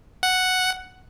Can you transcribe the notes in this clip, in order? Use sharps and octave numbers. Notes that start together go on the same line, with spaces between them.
F#5